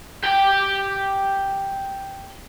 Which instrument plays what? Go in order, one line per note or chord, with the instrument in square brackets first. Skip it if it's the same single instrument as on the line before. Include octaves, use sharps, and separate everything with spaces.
[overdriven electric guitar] G4 G5